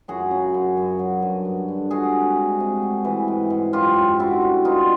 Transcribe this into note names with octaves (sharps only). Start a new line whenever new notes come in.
F#2 F#4 G#4
C#3
F#2
F#2
F#3
G2
G2
D3
G#3 F#4 G#4
C3
G#3
C3
A3
E3
G#2
G#2
F#2 F4 G4
F#2
D3 E4 F#4
G3
B2 D#4 F4